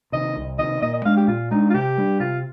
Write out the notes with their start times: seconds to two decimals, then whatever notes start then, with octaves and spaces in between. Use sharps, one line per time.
0.12 C3 D#3 D#5
0.36 C2
0.59 C3 D#3 D#5
0.82 A#2 D#5
0.94 D#5
1.05 G#3 D4 F5
1.17 G4
1.27 A#2 F4
1.51 G#3 D4 D#4
1.70 F4
1.74 C3 G4
1.98 G3 D4
2.20 C3 F4